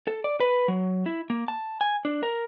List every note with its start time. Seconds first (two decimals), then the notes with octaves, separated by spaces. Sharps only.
0.07 A4
0.24 D5
0.40 B4
0.68 F#3
1.06 E4
1.30 A#3
1.48 A5
1.81 G#5
2.05 D4
2.23 A#4